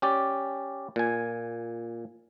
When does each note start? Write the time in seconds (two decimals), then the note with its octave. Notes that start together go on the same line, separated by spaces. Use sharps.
0.02 C#4 G4 D5
0.96 A#2 G#5